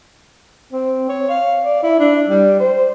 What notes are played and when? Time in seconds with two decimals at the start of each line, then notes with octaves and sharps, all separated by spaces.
0.72 C4
1.09 C#5
1.30 F5
1.64 D5
1.83 E4
1.99 D4
2.29 G3
2.60 C5